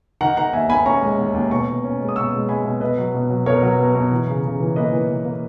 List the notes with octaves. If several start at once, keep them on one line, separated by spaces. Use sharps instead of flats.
D#3 F#5 A#5
D#3 F#5 A#5
D#2 E5 G#5
D#2 G#5 B5
C#4 A#5 C#6
G#3
D#2
D#2
B2 A#5 C#6
B2
C#4
G#3
D#6
B2 C#6 E6
G#3
G#3 G#5 B5
B2
B2 B4 D#5
F#3
B2
F#3
B2 A#4 C#5
F#3
B2
B2
E3
C#3
C#3
E3
A#3 B4 D#5
E3
E3
A#3